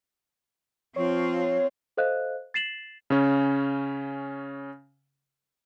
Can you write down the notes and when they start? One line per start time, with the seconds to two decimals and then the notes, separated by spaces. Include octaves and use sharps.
0.96 F3 C4 F4 C#5
1.97 A4 C5 D#5 F5 F#6
2.54 A6 C7 E7 F#7
3.10 C#3 C#4